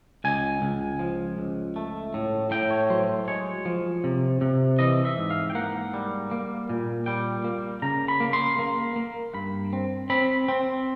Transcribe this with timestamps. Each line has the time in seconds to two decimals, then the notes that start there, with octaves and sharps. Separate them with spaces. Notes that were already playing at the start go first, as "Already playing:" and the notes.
0.24 C#2 G#5
0.62 C#2
0.99 F3
1.38 C#2
1.76 A3
2.14 A2
2.51 A2 G5
2.71 C#5
2.90 F#3 C5
3.28 G#3 C#5
3.65 F3
4.04 C3
4.41 C3
4.79 E3 D#5
5.05 E5
5.18 G#2
5.30 F5
5.50 G5
5.55 A#3 F#5
5.94 G3
6.31 A#3
6.69 A#2
7.06 G3 G5
7.44 A#3
7.82 C#3 A#5
8.08 B5
8.20 A#3
8.33 C6
8.59 A#3
8.96 A#3
9.34 G2 B5
9.73 C4
10.10 C4 B5
10.49 C4